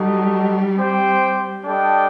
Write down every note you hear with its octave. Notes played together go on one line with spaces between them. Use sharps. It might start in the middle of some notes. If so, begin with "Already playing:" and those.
Already playing: G3 D#4 F#4 A4 D#5
C4 G4 C5 G5
G3 D4 A4 D#5 G5